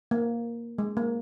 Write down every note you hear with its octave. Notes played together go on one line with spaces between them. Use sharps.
A#3
G#3
A#3